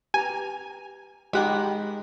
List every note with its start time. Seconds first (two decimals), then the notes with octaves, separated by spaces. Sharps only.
0.14 G4 B4 G#5 A#5
1.33 D#3 G#3 F#4 G4 D#5 F#5 B5